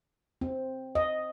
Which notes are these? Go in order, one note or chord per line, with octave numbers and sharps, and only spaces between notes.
C4
D#5